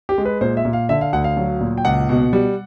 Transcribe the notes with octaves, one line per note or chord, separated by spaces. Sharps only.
G4
G#3
B4
A#2 C5
E5
A#2
F5
D3 E5
F5
D2 F#5
F5
F#3
A#2
G5
C#2 F#5
B2
G3